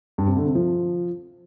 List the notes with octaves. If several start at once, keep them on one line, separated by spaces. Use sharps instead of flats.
G2
C3
D3
C3
F3